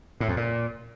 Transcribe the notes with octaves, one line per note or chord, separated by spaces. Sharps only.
A2
F2
A#2